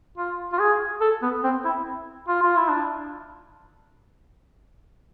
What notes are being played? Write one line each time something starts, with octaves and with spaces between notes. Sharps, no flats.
F4
F4
G#4
A4
B3
C4
E4
F4
F4
E4
D4